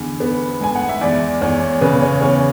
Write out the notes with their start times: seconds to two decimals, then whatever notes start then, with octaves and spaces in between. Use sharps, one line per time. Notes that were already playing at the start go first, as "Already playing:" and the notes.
Already playing: E2 D3
0.20 B3
0.61 G#3 G#5
0.75 F#5
0.89 E5
1.01 E2 D5
1.42 E2 C#5
1.81 C#3 B4
2.02 C#5
2.21 E2 C#5